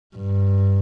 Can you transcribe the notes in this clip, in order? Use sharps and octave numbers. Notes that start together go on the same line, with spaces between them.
G2